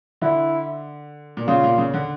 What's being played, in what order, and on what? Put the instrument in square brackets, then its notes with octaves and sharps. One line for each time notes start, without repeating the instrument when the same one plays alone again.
[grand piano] D3 [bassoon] E4
[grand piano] A#2
[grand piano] C#3 [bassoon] F4
[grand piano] A#2
C#3
D3